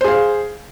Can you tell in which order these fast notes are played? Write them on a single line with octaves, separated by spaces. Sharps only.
C5 G#4 F5